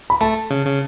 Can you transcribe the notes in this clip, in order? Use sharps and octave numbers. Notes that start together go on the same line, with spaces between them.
B5
A3 A5
C#3
C#3